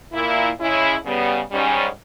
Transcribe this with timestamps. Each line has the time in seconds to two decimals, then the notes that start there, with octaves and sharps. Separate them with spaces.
0.13 A#2 A#3 E4
0.58 C#3 G#3 C#4 E4
1.04 C#3 G3 B3
1.50 G#2 G3 C#4